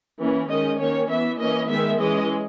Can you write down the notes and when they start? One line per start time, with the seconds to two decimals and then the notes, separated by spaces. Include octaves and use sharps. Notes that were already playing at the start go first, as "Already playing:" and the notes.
0.20 E3 A#3 C#4
0.49 D#3 G#3 C#4 D#5
0.80 D#3 A#3 C#4 C#5
1.10 E3 B3 E5
1.39 E3 A#3 C#4 D#5
1.70 D#3 G#3 B3 E5
2.00 E3 G#3 C#4 D#5